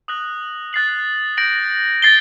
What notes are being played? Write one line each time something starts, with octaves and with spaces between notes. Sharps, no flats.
D#6 F#6 A#6 F#7
F#6 A6 C7 F#7
G6 A#6 D7 F#7
A6 C7 G7